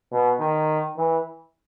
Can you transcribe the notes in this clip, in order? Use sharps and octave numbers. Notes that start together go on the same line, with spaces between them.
B2
D#3
E3